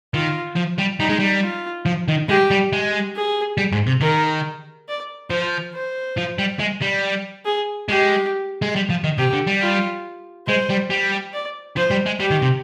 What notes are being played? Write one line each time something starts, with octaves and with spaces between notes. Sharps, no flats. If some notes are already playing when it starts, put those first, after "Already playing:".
D#3 F4
F3
G3
G3 D#4
G#3
G3
F4
F3
D#3
G#3 G4
G3
G#3
G#4
G3
G#2
C3
D#3 A#4
D5
F3 C5
C5
F3
G3
G#3
G3
G#4
G#3 G4
G#3
G3
F3
D#3
C3 G4
D3
G3
F4
G#3 C5
G3
G3
D5
F3 C5
G3
G#3
G3 G4
D#3
C3